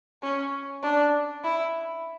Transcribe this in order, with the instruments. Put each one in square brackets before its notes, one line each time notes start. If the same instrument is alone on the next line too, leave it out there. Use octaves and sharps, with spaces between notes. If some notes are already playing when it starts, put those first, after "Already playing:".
[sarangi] C#4
D4
E4